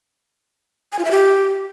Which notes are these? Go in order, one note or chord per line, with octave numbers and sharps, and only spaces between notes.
G#5
F4
E5
G4